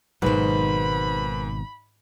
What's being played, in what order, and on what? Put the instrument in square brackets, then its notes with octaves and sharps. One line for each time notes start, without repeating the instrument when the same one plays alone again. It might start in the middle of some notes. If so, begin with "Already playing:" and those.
[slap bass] G#1 B2 F#3 [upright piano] G#2 D#3 [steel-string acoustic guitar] B4 C5 [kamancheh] B5